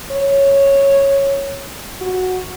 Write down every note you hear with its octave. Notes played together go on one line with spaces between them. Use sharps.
C#5
F#4